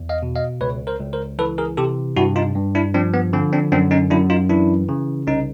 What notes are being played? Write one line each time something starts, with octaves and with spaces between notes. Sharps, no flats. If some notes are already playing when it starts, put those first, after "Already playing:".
Already playing: E2
D#5 F5
B2
D#5 F5
C#2 B4 C#5
A#4 C5
C#2
A#4 C5
E3 A4 B4
G#4 A#4
C3 G4 A4
G2 E4 F#4
D#4 F4
G2
D4 E4
F3 C4 D4
B3
D3 C4
C4 D4
F#2 C4 D4
C#4 D#4
F#2 D4 E4
D#4 F4
E3 D4 E4
C#3
C2 C#4 D#4